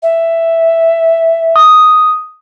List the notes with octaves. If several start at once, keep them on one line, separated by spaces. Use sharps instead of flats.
E5
D#6